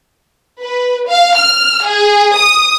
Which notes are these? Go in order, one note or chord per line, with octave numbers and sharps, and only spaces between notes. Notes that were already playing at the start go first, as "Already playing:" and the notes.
B4
F5
F6
G#4
D#6